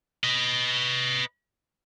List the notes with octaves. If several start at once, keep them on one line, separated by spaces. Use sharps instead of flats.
B4 D#5